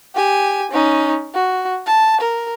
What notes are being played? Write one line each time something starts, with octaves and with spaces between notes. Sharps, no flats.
G4 G#5
C#4 D#4
F#4
A5
A#4